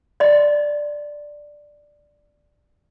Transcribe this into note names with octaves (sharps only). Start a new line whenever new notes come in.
D5 D#5 C6